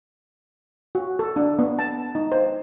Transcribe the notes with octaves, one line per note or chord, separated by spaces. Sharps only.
F#4
A4
D4
B3
A5
D#4
C5